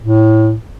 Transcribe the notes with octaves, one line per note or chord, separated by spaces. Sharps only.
A2